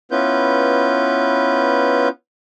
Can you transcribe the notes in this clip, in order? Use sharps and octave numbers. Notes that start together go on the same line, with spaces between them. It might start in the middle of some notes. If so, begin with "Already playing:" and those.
B3 C#4 E4 F4 B4 G6